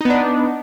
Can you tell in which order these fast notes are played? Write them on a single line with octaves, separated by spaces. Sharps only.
D#4 B3 D4